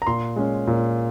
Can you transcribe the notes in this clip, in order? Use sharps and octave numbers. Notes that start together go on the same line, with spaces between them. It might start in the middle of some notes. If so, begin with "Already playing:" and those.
A#5
A#2 C6
G#3 C#4
A#2